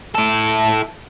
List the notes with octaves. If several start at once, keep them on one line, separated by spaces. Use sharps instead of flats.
E4 A4